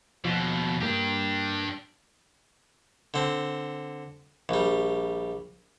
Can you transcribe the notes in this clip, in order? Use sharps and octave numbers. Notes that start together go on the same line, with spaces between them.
D#2 B2 F3
G2 A#3 D4 G4
D3 C4
A#1 G3